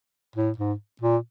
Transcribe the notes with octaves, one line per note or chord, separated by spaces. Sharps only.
A2
G#2
A#2